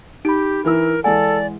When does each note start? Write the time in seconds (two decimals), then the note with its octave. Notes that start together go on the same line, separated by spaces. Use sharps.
0.25 D#4 G4 B5 D7
0.65 E3 E4 A#4 E6
1.04 E3 G#3 A4 D5 F#5 G#5